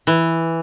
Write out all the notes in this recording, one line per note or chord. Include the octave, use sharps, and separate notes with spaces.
E3